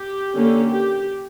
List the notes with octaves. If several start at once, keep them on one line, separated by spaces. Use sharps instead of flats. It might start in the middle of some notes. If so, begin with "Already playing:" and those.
Already playing: G4
D3 A#3 C#4
G4